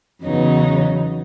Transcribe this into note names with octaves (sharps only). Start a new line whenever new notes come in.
E2 C#3 F#3 B3 D#4